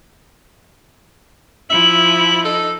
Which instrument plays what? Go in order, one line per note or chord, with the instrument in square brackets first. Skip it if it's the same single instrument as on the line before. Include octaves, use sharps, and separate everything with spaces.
[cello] F3 E4 [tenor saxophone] E5 [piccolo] F#7
[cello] D#4 [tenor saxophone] A4